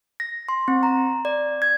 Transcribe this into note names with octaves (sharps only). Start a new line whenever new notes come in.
A#6
C6
C4
A#5
D5
G#6